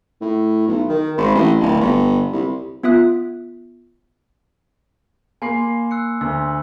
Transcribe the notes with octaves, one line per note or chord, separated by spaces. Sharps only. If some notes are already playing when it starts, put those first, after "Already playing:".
A2
B1
D#3
G#1
A1
D1
G1
C2
B3 F4 E5 D#6 F#6
A#3 G#5 B5 C6 C7
E6 F#6 C#7
D2 E6